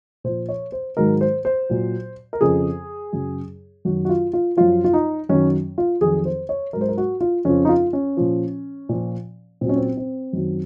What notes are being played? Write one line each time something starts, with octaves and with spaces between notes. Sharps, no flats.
A#2 F3 C5
C#5
C5
G#2 D#3 F#3 A#4
C5
C5
A#2 F#3
A#4
F2 C#3 F3 G#4
F#2 C#3 F#3
F#2 D#3 F#3 F#4
F#4
F4
F4
F#2 F3 F4
F4
D#4
F#2 D#3 F#3 C#4
F4
F2 D#3 F#3 G#4
C5
C#5
G#2 F#3 A#4
C5
A#4
F#4
F4
F2 C#3 F3 C#4
D#4
F4
C#4
A#2 F3
A#2 F3
A#2 F#3 C4
C#4
C4
C4
F#2 D#3 F#3